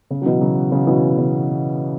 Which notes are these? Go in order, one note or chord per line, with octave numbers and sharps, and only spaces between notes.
C#3
F#3
B2 E3
C#3 F#3
C#3 F#3
B2 E3
C#3